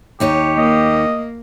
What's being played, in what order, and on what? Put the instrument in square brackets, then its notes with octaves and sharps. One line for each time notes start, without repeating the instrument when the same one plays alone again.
[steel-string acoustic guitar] D#2 D#4 C#5 [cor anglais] G4
[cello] A#3 [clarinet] D#5